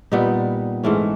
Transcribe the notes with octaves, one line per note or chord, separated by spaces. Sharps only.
A#2 G3 B3 D#4
G#2 E3 A3 C#4